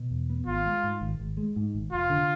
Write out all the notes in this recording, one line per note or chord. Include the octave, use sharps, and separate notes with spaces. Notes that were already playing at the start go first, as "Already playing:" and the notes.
Already playing: B2
E2
B3
G#1 F4
G#3
G#2
G#1
G#1
G#3
G#2
G#1
F1 F4
D3